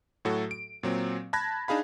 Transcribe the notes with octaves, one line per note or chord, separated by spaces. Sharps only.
A2 F#3 F#4 A4
D7
A#2 F#3 C4
A5 B5 F#6 G#6 A#6
D4 D#4 G#4 F5 B5